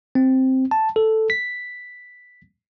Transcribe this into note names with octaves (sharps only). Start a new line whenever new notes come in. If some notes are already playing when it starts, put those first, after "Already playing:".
C4
A5
A4
B6